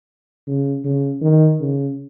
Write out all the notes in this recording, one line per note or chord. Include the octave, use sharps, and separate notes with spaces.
C#3
C#3
D#3
C#3